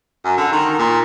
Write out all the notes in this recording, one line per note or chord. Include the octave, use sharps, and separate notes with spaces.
F#2
D3
D#3
A#2